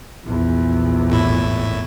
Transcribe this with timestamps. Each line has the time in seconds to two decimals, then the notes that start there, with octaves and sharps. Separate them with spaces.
0.23 A#1 E2
1.10 G#1 A2 E4